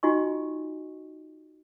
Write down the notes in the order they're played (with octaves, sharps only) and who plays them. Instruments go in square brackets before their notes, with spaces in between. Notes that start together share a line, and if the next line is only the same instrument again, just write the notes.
[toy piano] D#4 F4 F#4 D#5 G#5 C#6